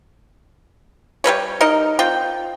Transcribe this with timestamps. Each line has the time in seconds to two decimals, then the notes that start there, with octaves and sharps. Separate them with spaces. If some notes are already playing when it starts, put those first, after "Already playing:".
1.24 G3 A#3 B4 C#5
1.61 D#4 A#4 D#5
1.99 C4 F4 G5